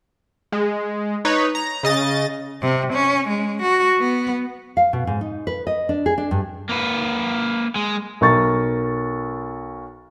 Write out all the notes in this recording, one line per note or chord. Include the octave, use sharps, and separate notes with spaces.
G#3
D#4 B4 C#5
A#5
C#3 D#5 A6
C3
C#4
G#3
F#4
B3
F5
B2
G#2
D#4
B4
D#5
D4
G#4
D4
G2
A#3 B4
G#3
B1 A#4 C#6 A6